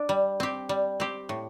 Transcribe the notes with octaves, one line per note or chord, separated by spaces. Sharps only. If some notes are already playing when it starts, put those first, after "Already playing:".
Already playing: D4
G3
C4 G4
G3
C4 G4
A2